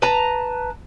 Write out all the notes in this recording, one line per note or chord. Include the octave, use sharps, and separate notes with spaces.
B4 A5 A#5